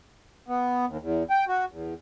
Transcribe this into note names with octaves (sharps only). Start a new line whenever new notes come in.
B3
D#2
E2
G5
F#4
E2